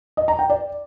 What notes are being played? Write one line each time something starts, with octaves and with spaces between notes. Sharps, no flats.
D#5
A#5
G5
D5